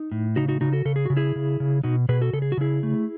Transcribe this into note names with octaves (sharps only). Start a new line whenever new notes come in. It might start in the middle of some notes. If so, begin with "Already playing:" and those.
Already playing: D#4
A2
C#3 D#4 F#4
D#4 F#4
C#3 D#4 F#4
F#4 A4
C#3 A4
G#4
C#3 F#4
E4 G#4
C#3
C#3
B2 D#4 F#4
B2 G#4 B4
F#4 A4
C#3 A4
G#4
F#4
C#3 E4 G#4
A3